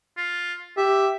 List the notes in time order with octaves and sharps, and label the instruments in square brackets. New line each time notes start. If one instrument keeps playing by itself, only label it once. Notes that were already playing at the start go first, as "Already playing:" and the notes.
[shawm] F4
[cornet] G4 [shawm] E5